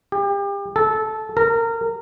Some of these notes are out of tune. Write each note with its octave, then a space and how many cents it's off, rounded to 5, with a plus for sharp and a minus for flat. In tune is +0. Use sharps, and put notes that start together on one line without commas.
G4 +35
A4 -15
A#4 -25